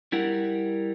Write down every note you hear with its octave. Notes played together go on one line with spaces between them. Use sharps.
G3 E4 A#4 F#5